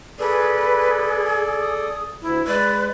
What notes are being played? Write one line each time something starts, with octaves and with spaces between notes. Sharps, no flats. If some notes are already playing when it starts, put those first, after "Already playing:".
G#4 A4 B4 D5
D#6
D2 E4
G#3 B4 D5